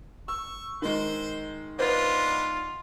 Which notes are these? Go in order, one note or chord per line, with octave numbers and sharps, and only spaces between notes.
C#6 E6
D#3 G#3 C5
B3 D4 F4 B4 C5 D#5